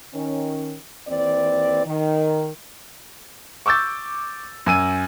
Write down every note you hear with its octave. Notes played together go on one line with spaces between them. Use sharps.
D#3 C#4
D#2 E3 C4 D5
D#3
C#6 D6 E6 G6 A6
F#2 G#5 E6 D#7